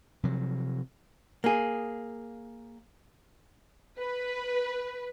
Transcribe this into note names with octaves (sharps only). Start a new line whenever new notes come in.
C3 F3 F#3
A#3 G#4
B4